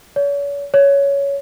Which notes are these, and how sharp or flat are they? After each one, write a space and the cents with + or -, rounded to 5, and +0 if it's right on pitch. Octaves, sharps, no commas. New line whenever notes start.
C#5 +40
C#5 +10